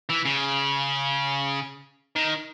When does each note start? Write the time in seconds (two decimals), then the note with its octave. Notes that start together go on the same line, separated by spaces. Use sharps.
0.09 E3
0.25 C#3
2.16 D#3